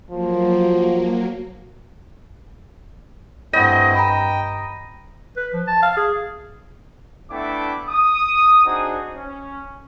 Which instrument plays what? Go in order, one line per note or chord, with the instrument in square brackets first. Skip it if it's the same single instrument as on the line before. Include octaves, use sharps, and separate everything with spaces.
[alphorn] F3 [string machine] F#3 A#3
[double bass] G2 [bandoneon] A3 C4 E4 [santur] D#5 [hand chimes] F#5 G6
[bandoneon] G5 [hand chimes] A#5 B5
[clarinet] B4
F3
A5
F5
G#4
[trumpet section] A3 B3 D4 E4 G5 D6
D#6
C4 D4 D#4 F#4 G#4 C5
C#4